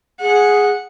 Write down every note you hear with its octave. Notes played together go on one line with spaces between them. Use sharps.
G#4 F#5